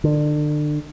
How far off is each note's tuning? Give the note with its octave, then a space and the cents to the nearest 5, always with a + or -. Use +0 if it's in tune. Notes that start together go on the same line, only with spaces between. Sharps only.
D3 +30